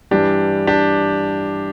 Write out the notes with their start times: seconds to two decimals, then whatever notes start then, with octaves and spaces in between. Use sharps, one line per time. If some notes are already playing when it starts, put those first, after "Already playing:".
0.11 G2 E3 G3 D4 G4
0.67 D4 G4